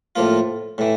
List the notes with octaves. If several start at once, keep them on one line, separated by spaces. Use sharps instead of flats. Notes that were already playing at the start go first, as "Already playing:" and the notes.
A2 F3 A#3 F4
A2 E3